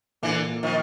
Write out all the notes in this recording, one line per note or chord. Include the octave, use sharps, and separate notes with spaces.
A#2 D3 E3 A#3
A#2 A#3
D#3 F3